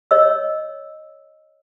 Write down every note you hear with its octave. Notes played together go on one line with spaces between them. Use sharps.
C#5 D#5 E6